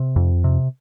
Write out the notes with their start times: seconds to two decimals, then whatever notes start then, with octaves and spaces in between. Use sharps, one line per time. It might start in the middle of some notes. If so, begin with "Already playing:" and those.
Already playing: C3
0.16 F2
0.44 C3